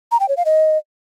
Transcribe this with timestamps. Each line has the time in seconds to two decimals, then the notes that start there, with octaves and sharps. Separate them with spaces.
0.12 A#5
0.20 G5
0.29 C#5
0.37 F5
0.45 D#5